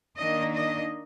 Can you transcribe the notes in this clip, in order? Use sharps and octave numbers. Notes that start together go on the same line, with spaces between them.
D#3 A#3 D4 D#5
D#5